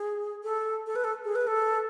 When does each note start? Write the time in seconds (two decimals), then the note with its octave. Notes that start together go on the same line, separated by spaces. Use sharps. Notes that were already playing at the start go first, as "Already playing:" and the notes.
Already playing: G#4
0.44 A4
0.87 A4
0.96 B4
1.04 A4
1.25 G#4
1.35 B4
1.47 A4